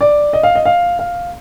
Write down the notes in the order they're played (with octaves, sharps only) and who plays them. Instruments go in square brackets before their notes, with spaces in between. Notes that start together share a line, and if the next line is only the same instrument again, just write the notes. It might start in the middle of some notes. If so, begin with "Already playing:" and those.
[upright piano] D5
D#5
F5
D#5
F5
F5